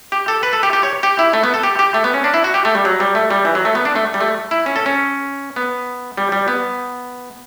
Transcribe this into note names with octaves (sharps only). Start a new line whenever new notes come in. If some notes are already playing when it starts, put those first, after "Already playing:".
G4
A4
B4
A4
G4
G4
C#5
G4
E4
A3
B3
A4
G4
G4
A3
B3
C#4
D4
E4
F#4
G4
A3
G3
F#3
G3
A3
G3
E3
F#3
A3
B3
D4
A3
G3
A3
E4
C#4
A4
C#4
B3
G3
G3
B3